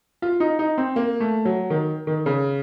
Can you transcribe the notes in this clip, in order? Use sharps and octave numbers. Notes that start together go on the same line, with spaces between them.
F4
D#4
D#4
C4
A#3
A3
F#3
D#3
D#3
C#3